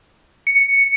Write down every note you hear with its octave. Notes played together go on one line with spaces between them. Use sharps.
C#7